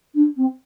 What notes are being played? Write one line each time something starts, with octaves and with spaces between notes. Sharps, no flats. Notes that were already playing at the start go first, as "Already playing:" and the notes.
D4
C4